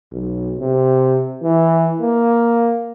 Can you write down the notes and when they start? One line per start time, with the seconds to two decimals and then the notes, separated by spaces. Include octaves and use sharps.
0.12 B1
0.59 C3
1.42 E3
2.01 A#3